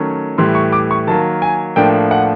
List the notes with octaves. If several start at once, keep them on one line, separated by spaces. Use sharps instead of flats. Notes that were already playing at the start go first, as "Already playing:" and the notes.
Already playing: D#3 F#3 A3 C#4
A2 E3 G3 C6
C#6
D6
C#6
D#3 F#3 A#3 A5
G#5
A2 F3 A#3 D4 G5
F#5